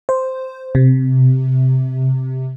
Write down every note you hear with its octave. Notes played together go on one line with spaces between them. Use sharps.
C5
C3